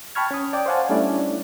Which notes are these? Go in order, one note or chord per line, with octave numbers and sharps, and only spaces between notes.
G5 A5 B5 C#6 F6 G#6
C#4 D#6
D5 G5 D6
C5 C#5 F5 F#5 G#5 A5
G3 A3 C#4 D4 E4 D5